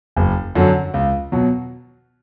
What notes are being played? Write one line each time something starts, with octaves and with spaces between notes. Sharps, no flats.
F#1
F#2 D3 F#3
C#2
B2 F#3